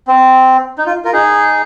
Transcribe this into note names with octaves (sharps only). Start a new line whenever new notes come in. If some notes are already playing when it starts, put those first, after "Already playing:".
C4
D#4
F4
F4 A#4
D#4 G#4